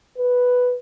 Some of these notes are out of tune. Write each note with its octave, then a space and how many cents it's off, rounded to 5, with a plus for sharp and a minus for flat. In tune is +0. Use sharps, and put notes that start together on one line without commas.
B4 +0